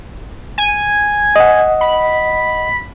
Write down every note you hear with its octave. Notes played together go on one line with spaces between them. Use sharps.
G#5
D#5 F#5
B5